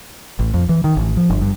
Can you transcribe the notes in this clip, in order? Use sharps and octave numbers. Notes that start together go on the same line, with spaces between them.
A1
F2
E3
D#3
A1
F3
G1
G2